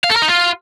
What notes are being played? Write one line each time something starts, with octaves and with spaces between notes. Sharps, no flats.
F5
A4
A#4
D#4
F4